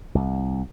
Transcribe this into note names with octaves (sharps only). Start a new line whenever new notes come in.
C2